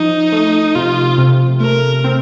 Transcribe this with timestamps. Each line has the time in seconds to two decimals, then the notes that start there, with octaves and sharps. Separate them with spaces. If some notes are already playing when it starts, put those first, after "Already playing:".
Already playing: F3 D#4
0.32 A3
0.75 C3 F4
1.18 C3
1.60 A3 A#4
2.04 C4